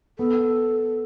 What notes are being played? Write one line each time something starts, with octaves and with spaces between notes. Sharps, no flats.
B3 A4